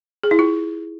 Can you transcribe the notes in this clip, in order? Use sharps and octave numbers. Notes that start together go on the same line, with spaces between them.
G#4
E4
F4